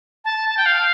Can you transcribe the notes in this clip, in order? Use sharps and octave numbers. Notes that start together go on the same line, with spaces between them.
A5
A5
G5
F5